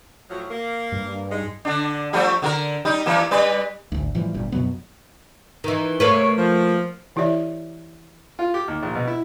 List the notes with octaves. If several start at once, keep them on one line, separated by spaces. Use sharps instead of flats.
A2 F3 F#3
A#3
G2
G#3 D#4
D3 D4
F3 G3 A3
D3 F4 A#4
G3 D#4
E3 G3 A#3
G3 B4 D5
G#1 D2
A2 E3 F3 G3
G1 G2 A#2 G3
F#2 B2 F#3 B3
D#3 E3
C3 A3 A#3 B4 C#5
F3
E3 E4 G4 C#5 D5 E5
F4
G4
D#2
A#1
B2
E4